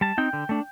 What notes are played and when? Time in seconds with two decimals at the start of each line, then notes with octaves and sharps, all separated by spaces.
0.01 G3 A5
0.18 C4 D#4 G5
0.33 D3
0.49 A3 D4